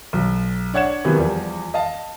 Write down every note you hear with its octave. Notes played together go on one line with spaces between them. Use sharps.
B1
D4 C#5 F#5 G#6 E7
C3 D#3 E3 F#3 A#3 B3
E2 F3 G3
D#5 F5 A5